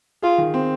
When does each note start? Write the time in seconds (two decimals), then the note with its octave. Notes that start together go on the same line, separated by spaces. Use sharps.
0.22 F4 G#4
0.38 D#3
0.54 C4